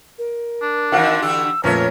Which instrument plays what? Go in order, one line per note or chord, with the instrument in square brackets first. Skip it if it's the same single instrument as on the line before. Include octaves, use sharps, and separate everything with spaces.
[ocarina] A#4
[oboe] D4
[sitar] D#3 E3 C4 [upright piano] F#4 F5 F#5
[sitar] D3 E3 G4 [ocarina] E6
[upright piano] F2 A#2 A3 [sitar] C#4 C#5 [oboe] A#4 [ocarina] B4